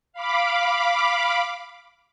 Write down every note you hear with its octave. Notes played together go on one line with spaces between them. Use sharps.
F5 B5 D6